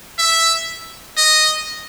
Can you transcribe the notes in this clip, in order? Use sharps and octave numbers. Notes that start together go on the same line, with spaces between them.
E5
D#5